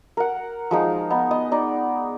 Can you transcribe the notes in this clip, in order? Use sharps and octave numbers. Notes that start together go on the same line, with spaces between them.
A#4 F#5
F3 G#3 D#4
B3 D#4
B3 D#5
D#4 D5